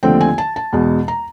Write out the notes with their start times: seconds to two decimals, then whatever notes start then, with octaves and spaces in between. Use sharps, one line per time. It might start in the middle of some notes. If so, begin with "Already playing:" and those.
0.03 D#2 D3 F3 A3 C4 G5
0.21 G#5
0.38 A5
0.56 A5
0.73 E2 B2 G#3
1.08 A#5